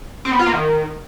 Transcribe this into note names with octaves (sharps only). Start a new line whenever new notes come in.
C4
B3
F4
A#3
D#3